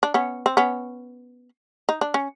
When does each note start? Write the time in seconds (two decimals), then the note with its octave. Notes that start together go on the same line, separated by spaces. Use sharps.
0.03 D4
0.14 B3 C#4
0.46 C4
0.57 B3 C#4
1.89 D#4
2.01 D4
2.14 C#4